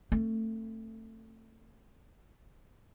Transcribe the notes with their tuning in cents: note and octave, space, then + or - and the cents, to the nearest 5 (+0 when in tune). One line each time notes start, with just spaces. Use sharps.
A3 +20 C4 +35